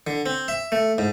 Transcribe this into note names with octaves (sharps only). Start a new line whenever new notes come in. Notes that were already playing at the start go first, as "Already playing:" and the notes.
D3
C4
E5
A3
G#2